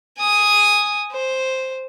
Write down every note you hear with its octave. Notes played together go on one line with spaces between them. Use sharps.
G#5 D#6
C5